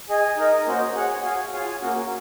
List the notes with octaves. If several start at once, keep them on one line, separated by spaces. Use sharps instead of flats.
G#4 D#5 G#5
D#4 A#4 D#5
A#3 C#4 F#4 C5 D#5
G#4 C#5 F#5
F#4 C#5 F5 G#5
F4 G#4 C#5 F5 G#5
A#3 C#4 F#4